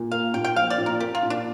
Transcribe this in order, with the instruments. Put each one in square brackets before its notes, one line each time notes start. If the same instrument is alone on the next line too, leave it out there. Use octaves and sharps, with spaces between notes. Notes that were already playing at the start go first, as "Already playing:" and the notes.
Already playing: [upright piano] A#2
[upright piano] A#3 [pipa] F5
[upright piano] A#2 [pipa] G5
[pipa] G5
[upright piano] F3 [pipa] F5
[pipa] D5
[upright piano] A#2
[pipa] A#4
[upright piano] A#3 [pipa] G4
[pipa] F4
[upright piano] A#2
[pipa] D4